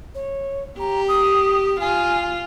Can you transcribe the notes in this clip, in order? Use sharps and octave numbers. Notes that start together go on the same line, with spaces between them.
C#5
G4 A#5
D#6
F4 G#5